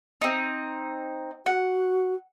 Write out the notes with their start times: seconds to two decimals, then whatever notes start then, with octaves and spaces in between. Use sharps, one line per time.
0.22 C4 D#4
1.46 F#4 F#5